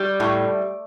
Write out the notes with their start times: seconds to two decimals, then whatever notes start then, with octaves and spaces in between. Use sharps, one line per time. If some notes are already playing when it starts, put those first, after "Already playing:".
Already playing: G3
0.20 A2